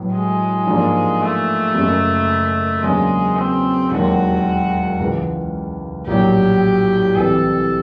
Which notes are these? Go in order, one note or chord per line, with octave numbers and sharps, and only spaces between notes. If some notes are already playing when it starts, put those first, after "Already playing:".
Already playing: A2 F#3 B3
G#3
G#2 F3 A#3 D4
A3
F#1 F#2 C#3
E2 C#3 F#3 G#3 A#3 D4
C4
E1 D#2 D#3 F#3 F#4
C#2 C#3 E3
A#1 A2 F#3 G4
C2 C3 E3 G3 A4